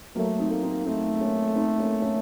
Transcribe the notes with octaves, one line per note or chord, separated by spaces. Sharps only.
F#3 A3 A#3
C4 D#4
A#3
C4 D#4
A3 C4 D#4
A#3 C#4
C4 D#4
A#3 C#4
A#3 C#4